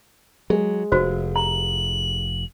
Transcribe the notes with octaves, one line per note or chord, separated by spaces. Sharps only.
F#3 G#3
F1 F#4 C5
A#5 F#7